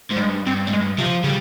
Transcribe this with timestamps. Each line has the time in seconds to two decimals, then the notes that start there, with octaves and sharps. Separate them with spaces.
0.11 G#2
0.17 G3
0.21 G2 G#3
0.47 G2 C4
0.67 G#2
0.72 G2 G#3
0.98 C3 F3
1.24 C#3 G3